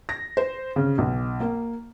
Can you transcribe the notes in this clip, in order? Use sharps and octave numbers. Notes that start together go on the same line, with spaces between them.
A#6
C5
C#3
B1
A#3